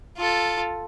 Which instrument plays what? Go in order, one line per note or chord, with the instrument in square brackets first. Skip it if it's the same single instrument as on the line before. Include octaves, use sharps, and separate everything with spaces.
[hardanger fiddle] F4 A4